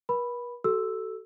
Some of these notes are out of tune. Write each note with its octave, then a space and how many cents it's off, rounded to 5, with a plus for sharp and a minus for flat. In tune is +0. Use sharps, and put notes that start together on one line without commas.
B4 -45 B5 +0
F#4 +40 A4 +0 E6 +0